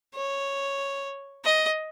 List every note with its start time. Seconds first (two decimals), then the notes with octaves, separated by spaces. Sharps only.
0.15 C#5
1.45 D#5